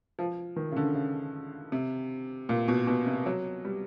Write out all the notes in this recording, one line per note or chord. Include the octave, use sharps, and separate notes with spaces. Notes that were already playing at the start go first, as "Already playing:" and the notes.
F3
D#3
C#3
D3
C#3
C3
A#2
B2
B2
C3
F#3
G3